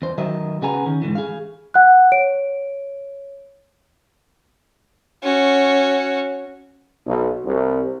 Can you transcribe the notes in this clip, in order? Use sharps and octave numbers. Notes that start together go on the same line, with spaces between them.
E2 C5
D#3 F#3 A#4 D#5 E5
C#3 B3 G#4 G#5 A#5
D#3 C#4
G#2 B2 D3 E3
G#4 F5
F#5 F#6
C#5 D7
C#4 F#4
B1
C2